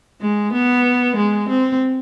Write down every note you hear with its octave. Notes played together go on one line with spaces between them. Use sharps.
G#3
B3
G#3
C4